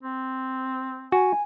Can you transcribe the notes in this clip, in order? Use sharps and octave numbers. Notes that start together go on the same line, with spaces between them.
C4
F#4 G#5